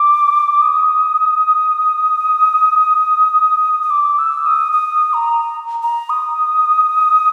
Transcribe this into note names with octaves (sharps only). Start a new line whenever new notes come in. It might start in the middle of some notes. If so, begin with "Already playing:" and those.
Already playing: D6
D#6
D#6
D6
E6
D#6
D#6
A#5
A#5
D#6